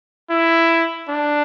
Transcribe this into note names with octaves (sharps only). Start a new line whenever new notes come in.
E4
D4